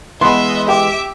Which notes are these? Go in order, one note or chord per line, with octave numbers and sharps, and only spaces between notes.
E3 G#3 B3 D#5 E5 C6
G4 E5 D6